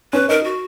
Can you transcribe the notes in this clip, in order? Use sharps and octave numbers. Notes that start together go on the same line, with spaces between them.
C#4 B4
D#4 A#4
F#4